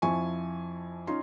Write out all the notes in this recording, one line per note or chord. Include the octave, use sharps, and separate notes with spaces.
F2 F3 E4 G#5 C#6
C#4 D#4 F4 C6